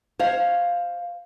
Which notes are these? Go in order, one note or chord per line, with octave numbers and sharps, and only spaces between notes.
C5 C#5 F5